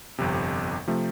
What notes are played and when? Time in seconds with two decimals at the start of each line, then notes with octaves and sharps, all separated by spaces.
0.18 G1 F2 C3
0.88 C3 F3 A3